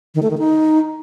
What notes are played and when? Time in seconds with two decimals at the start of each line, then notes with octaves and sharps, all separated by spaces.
0.15 D#3
0.23 A3
0.30 D#3
0.38 D#4